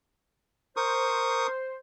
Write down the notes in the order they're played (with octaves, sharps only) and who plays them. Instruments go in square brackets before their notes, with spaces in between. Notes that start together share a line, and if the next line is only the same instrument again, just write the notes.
[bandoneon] A#4 C#6 D#6 [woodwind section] C5